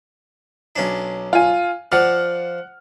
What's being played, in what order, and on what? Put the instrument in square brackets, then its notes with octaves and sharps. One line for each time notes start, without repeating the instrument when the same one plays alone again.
[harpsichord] B1 C#4 D4
[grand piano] F4 G#5
[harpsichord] F3 D5 [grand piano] F#5 F6